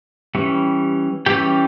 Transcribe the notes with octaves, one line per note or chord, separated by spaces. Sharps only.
E3 G3 C#4
E3 G3 C#4 G4 G5